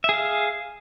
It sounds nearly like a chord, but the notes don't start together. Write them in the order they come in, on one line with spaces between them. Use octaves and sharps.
E5 G#4 F5